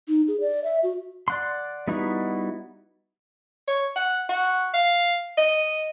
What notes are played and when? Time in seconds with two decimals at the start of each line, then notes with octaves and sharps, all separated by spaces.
0.08 D#4
0.28 G#4
0.41 D5
0.64 E5
0.83 F#4
1.28 D5 F#5 C6
1.88 G3 B3 D#4 E4 F#4
3.68 C#5
3.96 F#5
4.29 F#4
4.74 F5
5.38 D#5